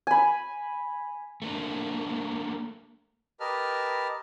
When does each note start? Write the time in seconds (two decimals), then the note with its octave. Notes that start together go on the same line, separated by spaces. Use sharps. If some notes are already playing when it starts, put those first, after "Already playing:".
0.07 G#5 B5
1.42 A3 A#3 D4
3.40 G4 A#4 B4 D#5 A5 F6